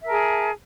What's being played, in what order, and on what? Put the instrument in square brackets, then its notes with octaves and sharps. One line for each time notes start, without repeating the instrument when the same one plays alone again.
[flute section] E5
A#4
A5
G#4